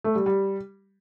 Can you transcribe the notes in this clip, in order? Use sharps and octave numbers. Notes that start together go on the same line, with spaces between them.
A3
G3
G3